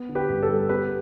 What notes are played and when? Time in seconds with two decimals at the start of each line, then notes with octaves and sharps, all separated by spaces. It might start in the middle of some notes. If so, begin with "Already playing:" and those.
Already playing: B3
0.09 D3
0.15 G4 B4
0.29 G2
0.43 A4
0.49 G3
0.69 B3 G4 B4